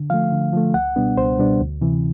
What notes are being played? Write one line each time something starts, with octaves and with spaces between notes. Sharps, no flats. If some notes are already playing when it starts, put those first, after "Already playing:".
Already playing: D3
F3 A3 F5
D3
F3 A3
C#2 F#5
B2 G3 B3 D4
C#2 C5
B2 G3 B3 D4
D2
C3 E3